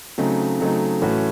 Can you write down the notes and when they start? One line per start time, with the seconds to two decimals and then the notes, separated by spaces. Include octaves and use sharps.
0.18 C#3 F#3 A3 C4 D#4
0.60 C#3 F#3 A3 C4 D#4
1.02 A2 E3 A3 C#4 F#4